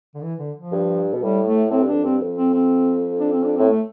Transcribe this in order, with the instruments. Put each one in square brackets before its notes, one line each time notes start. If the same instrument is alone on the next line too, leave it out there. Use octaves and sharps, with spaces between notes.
[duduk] D3
E3
D3
F3
[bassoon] G2
B2
[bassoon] A2 [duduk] G3
[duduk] A3
[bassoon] A2 [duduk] C4
[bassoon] G2
[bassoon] F2 [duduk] D4
[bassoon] G2 [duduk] C4
[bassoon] F2
[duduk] C4
C4
D4
C4
D4
[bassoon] A2 [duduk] C4
[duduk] A3